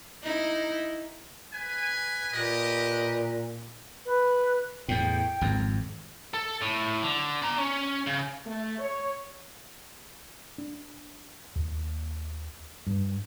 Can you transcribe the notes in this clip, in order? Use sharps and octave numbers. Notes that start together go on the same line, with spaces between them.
D#4 E4
B4 G#5
A#2 G4 B4 D#5
B4
E2 A2 G5
G#1 F2
A4
A2
D3
D5 A#5
C#4
C#3
A3
C#5
D4
D#2
G2